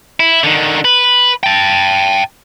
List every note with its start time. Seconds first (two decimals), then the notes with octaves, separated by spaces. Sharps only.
0.20 E4
0.44 D3 D#3
0.85 B4
1.43 G5 A5